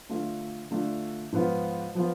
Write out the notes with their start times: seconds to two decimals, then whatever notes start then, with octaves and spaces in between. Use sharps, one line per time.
0.09 D3 A3 D4 F4
0.71 D3 A3 D4 F4
1.32 G#2 F3 B3 F4
1.95 F3 B3 F4